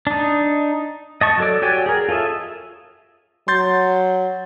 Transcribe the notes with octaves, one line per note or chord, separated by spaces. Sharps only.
D4 D#4
D#5 A5 C#6
F#3 A4 D5
F#4 G4 C#5 D5 G#5
G#4 A#4
F4 A4 C#5 D#5 E5
F#3 C6 G6 A6